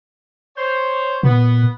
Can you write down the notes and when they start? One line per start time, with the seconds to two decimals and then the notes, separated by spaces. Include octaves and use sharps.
0.56 C5 C#5
1.23 A#2 B3